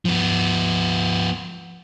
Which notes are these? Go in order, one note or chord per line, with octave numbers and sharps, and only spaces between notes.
F3 B3